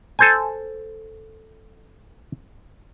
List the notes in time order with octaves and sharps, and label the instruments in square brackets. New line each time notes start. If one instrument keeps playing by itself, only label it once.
[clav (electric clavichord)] A4 C5 G#5